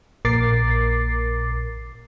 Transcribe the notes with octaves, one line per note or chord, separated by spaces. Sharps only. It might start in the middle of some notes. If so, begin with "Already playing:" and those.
A#1 A#2 A#4 D6 A6 C7